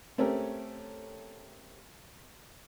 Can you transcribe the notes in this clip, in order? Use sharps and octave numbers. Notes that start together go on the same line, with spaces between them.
A3 C4 C#4 G4 A4 A#4